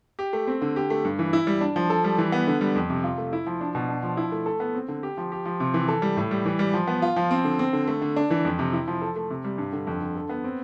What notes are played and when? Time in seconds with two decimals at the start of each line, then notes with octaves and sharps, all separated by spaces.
0.19 G4
0.33 A3
0.47 C4
0.62 D3
0.76 G4
0.90 A3
1.05 G2
1.19 E3
1.33 E4
1.47 G3
1.61 D4
1.76 F3
1.90 A4
2.04 G3
2.18 E3
2.32 B3
2.47 D3
2.61 G3
2.75 F2
2.90 C3
3.04 F4
3.18 A3
3.33 E4
3.46 F3
3.61 D4
3.75 B2
3.89 D4
4.03 F3
4.17 E4
4.32 A3
4.46 A4
4.60 B3
4.75 C4
4.88 D3
5.03 G4
5.17 F3
5.32 G4
5.46 F3
5.60 C3
5.74 E3
5.88 A4
6.02 G3
6.17 A2
6.31 G3
6.45 E3
6.59 G3
6.74 F3
6.87 B3
7.02 F4
7.16 F3
7.31 C4
7.44 D3
7.59 C4
7.73 D3
7.88 A3
8.02 D3
8.16 D4
8.30 E3
8.45 F2
8.59 C3
8.73 E4
8.88 F3
9.02 A4
9.16 A3
9.30 C3
9.44 G3
9.58 G2
9.73 D3
9.87 F2
10.01 D3
10.16 A4
10.29 B3
10.44 C4